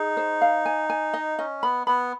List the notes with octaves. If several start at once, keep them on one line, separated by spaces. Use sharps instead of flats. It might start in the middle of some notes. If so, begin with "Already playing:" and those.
Already playing: D#4 G#4
C5
F5
G#5
G#5
D#5
C#4 D#5
B3 B5
B3 B5